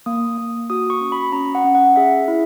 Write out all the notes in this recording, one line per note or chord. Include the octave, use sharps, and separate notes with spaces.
A#3 D#6
A#3
F#4 D#6
C#6
C#4
B5
C#4 A#5
F#5
C#4
F#5
G#4 E5
E4